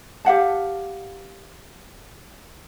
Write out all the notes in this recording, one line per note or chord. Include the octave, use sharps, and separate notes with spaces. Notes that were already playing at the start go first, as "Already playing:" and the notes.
G4 F5 F#5 A5